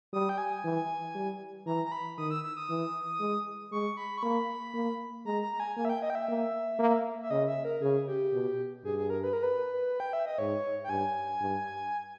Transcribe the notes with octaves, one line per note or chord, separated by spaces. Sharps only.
G3 D#6
G5
G#5
E3
G3
E3 A#5
A#5
B5
D#3 D#6
E6
E6
D#6
E3
G#3
G#3 C#6
B5
C#6
A#3 B5
A#3
G#3 A#5
A#5
A#5
G#5
A#3 G#5
E5
G5
D#5
G5
E5
A#3
A#3
E5
C#3 D#5
E5
A#4
C#3 G#4
G4
B2
G2 G#4
G#4
A#4
B4
A#4
B4
G5
E5
D#5
G#2 C#5
G5
G2 G#5
G2